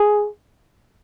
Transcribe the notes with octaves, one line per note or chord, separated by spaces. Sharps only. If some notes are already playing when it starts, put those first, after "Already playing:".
Already playing: G#4